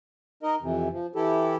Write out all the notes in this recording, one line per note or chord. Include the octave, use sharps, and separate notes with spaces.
D#4 A#4 D#5
F2 C3 E3
F3
E3 E4 G4 A4